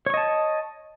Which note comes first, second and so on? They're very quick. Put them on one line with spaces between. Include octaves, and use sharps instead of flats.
C#5 C#6 D#5 A5